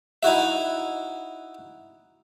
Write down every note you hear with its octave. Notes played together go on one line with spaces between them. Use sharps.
D#4 E4 F#4 E5